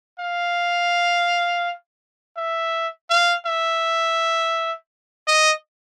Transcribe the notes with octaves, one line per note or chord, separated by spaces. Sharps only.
F5
E5
F5
E5
D#5